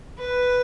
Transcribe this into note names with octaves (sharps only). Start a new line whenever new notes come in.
B4